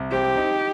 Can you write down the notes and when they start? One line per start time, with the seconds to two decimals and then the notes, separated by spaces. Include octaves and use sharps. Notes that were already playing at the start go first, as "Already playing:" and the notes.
Already playing: C2
0.12 C4 G4
0.37 D#4